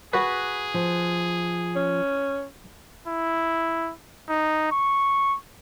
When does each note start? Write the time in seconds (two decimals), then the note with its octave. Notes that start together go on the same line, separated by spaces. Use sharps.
0.13 F#4 G#4 B4
0.74 F3
1.76 C#4
3.08 E4
4.29 D#4
4.72 C#6